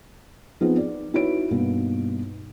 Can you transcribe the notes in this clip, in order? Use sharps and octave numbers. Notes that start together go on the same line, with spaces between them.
F3 B3 C4 D#4 G#4
D5
D#4 E4 F#4 B4 C#5 D7
G2 B2 A#3 D#4